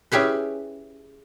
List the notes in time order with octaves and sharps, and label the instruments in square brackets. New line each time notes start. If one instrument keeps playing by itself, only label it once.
[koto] C#4 E4 G4 G#4 B4